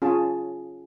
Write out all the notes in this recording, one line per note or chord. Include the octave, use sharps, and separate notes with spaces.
C#4 F4 G#4 A5